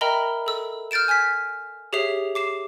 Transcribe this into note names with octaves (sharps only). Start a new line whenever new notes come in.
A#4 D#5 E5 G5 A#5 B5
A4 E6
F6 G6 A6 D7 E7
G#5 F6 G#6 B6
G4 G#4 C#5 E5 C7 F7
D6 C7 E7